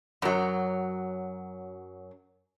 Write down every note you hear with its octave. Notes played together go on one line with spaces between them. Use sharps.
F#2 F#3